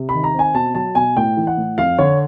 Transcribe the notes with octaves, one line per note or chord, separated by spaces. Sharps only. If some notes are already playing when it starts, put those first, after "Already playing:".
Already playing: C3
D#3 B5
A#5
C4 G#5
B2 A5
F#3 A5
B2 G#5
A2 G5
E3
F#5
A2
F2 F5
D3 C#5